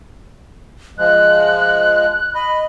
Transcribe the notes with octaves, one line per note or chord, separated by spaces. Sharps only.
F3 G#3 F#6
D#5 B5